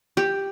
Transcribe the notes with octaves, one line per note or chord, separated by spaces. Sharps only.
G4